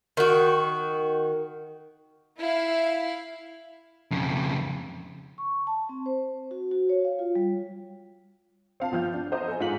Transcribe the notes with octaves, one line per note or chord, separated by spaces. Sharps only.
D#3 F#4
E4 F5
F2 C#3
C#6
A5
C4
C5
F#4
F#4
C#5
F5
F4
G3
C4 F5 A5
G1 F3 G5 F6 G6
D4
A4 C5 D#5 E5 F#5 A#5
A4 G#5
G#2 F4 G#4 F#5 B6 F#7